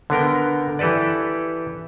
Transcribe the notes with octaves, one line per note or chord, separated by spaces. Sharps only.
D3 B3 A#4 G5
E3 G4 A4 B4 D5